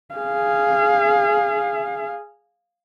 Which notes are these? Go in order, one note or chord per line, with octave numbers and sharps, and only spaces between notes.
G#4 F5